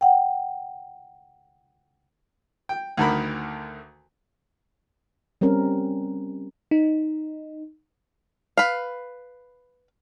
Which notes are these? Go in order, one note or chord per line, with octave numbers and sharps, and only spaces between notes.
F#5 G5
G5
D2 D3 D#3 A#4 B5
G3 C4 C#4 A#4
D#4
B4 F5